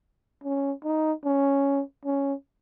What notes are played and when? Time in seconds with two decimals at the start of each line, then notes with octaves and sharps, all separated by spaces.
0.44 C#4
0.84 D#4
1.25 C#4
2.05 C#4